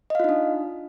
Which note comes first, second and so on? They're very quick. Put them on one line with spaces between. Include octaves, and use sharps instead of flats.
D#5 F5 F4 D#4 D4